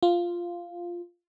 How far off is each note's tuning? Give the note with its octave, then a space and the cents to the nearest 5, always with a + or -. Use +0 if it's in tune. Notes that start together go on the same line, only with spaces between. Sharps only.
F4 -5